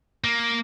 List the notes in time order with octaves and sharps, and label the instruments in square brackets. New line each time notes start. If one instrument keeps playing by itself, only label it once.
[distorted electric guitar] A#3